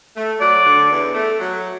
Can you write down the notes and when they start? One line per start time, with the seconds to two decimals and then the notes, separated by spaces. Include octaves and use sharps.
0.15 A3
0.40 F#3 D5
0.65 D3
0.90 E2
1.15 A3
1.40 F#3